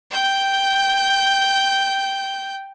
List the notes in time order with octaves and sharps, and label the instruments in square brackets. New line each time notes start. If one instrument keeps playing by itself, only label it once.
[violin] G5 G6